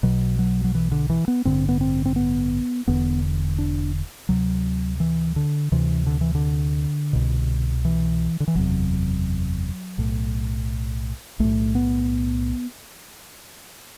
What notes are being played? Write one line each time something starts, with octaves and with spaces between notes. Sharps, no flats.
B1 B2 F#3
F#3
F#3
E3
D3
E3
B3
A1 G2 D3 C4
B3
C4
C4
B3
E1 E2 D3 B3
D4
D2 C3 F#3
E3
D3
D2 C3 E3
D3
E3
D3
C2 B2
E3
D3
E3
F#1 E2 C3 F#3
B1 A2
B1 A2 A3
B3